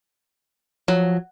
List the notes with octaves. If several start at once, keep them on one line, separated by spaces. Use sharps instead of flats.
F3 F#3